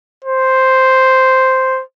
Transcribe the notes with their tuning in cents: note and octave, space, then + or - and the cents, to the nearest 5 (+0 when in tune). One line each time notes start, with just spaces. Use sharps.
C5 +0